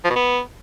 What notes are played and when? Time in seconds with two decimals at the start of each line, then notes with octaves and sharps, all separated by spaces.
0.05 F3
0.10 B2
0.16 B3